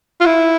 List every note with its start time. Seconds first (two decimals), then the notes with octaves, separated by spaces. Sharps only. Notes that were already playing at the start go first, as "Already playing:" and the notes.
0.21 F4
0.26 E4